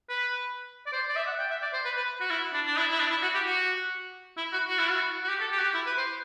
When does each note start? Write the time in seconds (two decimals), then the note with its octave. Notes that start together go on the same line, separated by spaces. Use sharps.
0.09 B4
0.86 D5
0.93 C5
1.09 D5
1.16 E5
1.27 F#5
1.39 G5
1.50 E5
1.62 D5
1.73 C5
1.85 B4
1.96 B4
2.20 F#4
2.30 E4
2.53 D4
2.66 D4
2.77 E4
2.91 E4
2.99 D4
3.11 E4
3.22 F#4
3.34 G4
3.46 F#4
4.37 E4
4.52 F#4
4.67 F#4
4.79 E4
4.90 F#4
5.24 F#4
5.29 G4
5.40 A4
5.52 G4
5.59 F#4
5.63 G4
5.74 E4
5.86 B4
5.98 C5